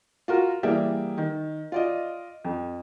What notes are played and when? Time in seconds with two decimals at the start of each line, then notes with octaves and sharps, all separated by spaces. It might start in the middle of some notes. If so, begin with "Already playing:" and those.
0.28 F4 F#4 A#4
0.63 E3 G3 A#3 G#4 D5 E5
1.18 D#3
1.72 F4 D5 D#5
2.44 F2